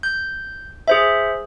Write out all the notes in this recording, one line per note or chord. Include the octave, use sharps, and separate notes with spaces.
G6
G#4 C5 E5